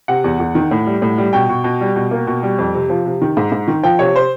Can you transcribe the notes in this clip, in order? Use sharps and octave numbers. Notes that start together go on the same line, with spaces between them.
C3 F#5
E2
E2
D#3
A2
G3
A2
G3
B2 G5
B2
B2
G3
B2
A#3
B2
G3
F2
C3
F3
C3
D#3
G#2
G#2
D#3
F3 G5
C3 C#5
C5